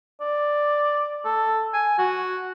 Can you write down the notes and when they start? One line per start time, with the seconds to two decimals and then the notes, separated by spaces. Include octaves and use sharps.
0.21 D5
1.25 A4
1.74 G#5
1.98 F#4